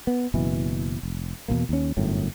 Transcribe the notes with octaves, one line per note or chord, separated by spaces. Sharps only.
B3
F#1 B2 E3
F1
E2 G#2 B2 A#3
D#2 C#4
G1 F#2 A2